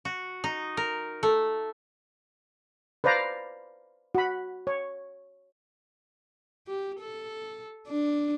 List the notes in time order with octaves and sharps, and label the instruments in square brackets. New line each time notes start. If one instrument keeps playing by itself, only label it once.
[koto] F#4
D#4
A#4
A3
[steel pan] B4 C5 D5 F5 A#5
F#4 B5
C#5
[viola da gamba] G4
A4
D4